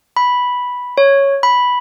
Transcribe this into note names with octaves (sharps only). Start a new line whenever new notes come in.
B5
C#5
B5